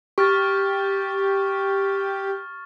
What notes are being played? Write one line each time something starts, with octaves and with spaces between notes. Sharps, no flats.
G4 C#6 F6 A6